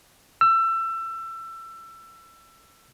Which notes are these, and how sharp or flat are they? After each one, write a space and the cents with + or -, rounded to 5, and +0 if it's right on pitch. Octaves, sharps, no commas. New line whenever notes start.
E6 +25